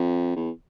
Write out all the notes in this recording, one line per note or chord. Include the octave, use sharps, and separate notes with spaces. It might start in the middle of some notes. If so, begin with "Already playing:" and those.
Already playing: F2
E2